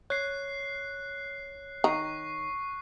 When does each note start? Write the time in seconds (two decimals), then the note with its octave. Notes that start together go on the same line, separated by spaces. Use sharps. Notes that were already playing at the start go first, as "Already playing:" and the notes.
0.10 C#5 F#6 C7
1.84 D#3 A#5 C#6 C7